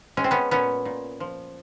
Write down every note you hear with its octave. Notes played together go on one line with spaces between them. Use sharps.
G#3 C#4
C4
B3 C#4
A#2 B3 C#4
A#2
F3